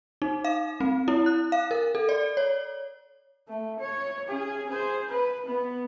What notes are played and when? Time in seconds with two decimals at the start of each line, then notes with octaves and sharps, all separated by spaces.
0.22 D#4
0.44 F5
0.80 C4
1.08 E4
1.26 F#6
1.52 F5
1.71 A#4
1.95 A4
2.09 D5
2.37 C#5
3.48 A3
3.79 C#5
4.28 C#4 G#4
4.69 G#4 C5
5.10 B4
5.46 B3